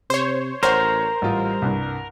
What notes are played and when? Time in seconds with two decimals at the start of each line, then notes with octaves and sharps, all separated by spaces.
0.10 C3 C5 C#5
0.63 A1 A#4 C5 C#5 F#5
1.22 A1 G3 F4
1.62 C2 G2